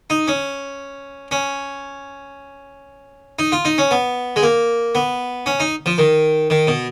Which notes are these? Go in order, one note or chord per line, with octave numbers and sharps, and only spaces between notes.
D#4
C#4
C#4
D#4
F4
D#4
C#4
B3
G#3
A#3
B3
C#4
D#4
F3
D#3
D#3
B2